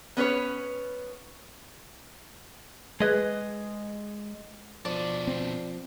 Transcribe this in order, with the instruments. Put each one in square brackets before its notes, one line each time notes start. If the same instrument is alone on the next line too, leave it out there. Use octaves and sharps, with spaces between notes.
[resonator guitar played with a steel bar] B3 C#4 B4 C#5
[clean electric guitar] G#3 D#5 [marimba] G#4 B4 F#6
[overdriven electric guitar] B2 D4 [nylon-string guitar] F3 [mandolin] D5
[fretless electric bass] C4